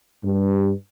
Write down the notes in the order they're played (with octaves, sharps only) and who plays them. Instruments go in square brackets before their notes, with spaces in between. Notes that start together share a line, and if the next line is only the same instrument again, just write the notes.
[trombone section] G2